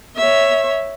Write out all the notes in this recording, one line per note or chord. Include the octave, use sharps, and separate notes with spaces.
C#5 E5